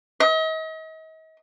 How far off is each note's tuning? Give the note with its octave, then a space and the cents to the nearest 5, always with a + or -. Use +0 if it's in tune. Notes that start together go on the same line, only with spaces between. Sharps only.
D#5 +40